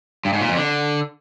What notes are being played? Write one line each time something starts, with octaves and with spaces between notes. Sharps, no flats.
G2
G#2
A#2
F2
D3